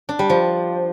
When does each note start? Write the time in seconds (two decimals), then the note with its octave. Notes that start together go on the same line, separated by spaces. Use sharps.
0.09 D4
0.19 G3
0.30 F3